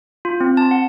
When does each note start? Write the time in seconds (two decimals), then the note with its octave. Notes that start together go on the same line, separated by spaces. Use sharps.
0.25 F4
0.40 C4
0.57 A5
0.71 F#5